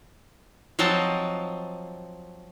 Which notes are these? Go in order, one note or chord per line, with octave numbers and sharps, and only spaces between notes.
F3 F#3 C4 D#5 A5